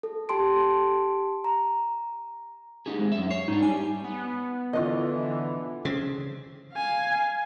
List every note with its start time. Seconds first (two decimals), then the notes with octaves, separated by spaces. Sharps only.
0.03 A4
0.29 G4 A5 C6 D7
1.44 A#5
2.86 D#4 G4 G#4
2.99 G#3 C4
3.12 F#2 E5
3.31 C#5 C7
3.48 G#2 D4 D#4
3.63 G3 G#5
4.04 B3
4.73 D3 E3 F4 D#5
5.85 C#3 C4
6.73 F5 G#5